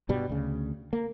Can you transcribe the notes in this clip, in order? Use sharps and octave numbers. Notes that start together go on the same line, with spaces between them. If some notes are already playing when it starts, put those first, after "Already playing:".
G2 B2 G3
D2 C#3
A#3